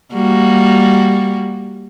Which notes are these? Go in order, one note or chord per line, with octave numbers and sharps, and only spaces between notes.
G3 A#3 F#4